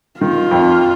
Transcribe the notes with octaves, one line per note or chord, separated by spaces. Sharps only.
D#3 F4
F2